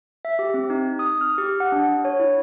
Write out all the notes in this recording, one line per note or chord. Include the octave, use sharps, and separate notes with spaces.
E5
G4
C4
D#4
D#6
F6
G4
F#5
D4
C#5
E4